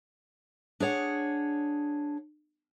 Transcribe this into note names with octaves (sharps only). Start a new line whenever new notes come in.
D4 G#4 C#5 F#5